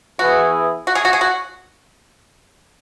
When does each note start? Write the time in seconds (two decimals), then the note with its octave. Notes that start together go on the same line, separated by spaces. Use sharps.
0.19 E3 B3 E4 F#4 G#4
0.87 F#4
0.95 G#4
1.05 F#4
1.13 G#4
1.21 F#4